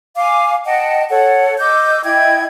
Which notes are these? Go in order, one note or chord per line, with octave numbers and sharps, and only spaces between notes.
F5 G#5 D6
D#5 F#5 G5 A5
A4 C#5 F#5
D#5 D6 E6 G6
E4 D#5 G5 G#6